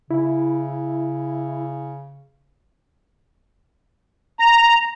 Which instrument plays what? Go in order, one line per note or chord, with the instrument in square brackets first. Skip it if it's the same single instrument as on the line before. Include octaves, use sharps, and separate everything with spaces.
[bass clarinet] C#3 [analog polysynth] E4
[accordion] A#5